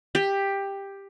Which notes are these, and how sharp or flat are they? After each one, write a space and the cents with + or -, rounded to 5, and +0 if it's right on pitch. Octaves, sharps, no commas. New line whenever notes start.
G4 +10